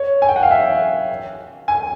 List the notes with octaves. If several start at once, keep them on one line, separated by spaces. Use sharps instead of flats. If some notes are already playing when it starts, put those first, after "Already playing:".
Already playing: C#5
G#5
G5
F#5
F5
E5
G#5